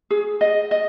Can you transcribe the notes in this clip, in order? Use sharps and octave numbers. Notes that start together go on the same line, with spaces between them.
G#4
D#5
D#5